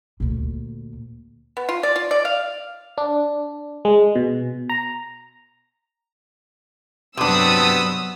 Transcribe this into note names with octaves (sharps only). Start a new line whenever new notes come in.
D2 A#2
B3
F4
D5
F4
D5
F5
D4
G#3
B2
A#5
G2 C3 F#3 G3 B3 D4 D#6 E6